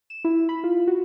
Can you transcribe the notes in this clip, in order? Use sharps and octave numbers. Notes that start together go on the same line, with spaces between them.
E7
E4
B5
F4
F#4